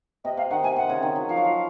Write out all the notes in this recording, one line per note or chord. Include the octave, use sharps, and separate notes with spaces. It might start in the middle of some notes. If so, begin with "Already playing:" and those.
C3 D#5
C3 F5
D#3 F#5
C3 G#5
C3 F#5
C#3
D#3
F#3
F3 F5
F#3
F3